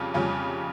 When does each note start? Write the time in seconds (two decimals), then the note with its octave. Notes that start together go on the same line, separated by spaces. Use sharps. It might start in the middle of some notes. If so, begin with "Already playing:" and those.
Already playing: F2 C#3 G3 C#4 F4
0.14 F2 C#3 G3 C#4 F4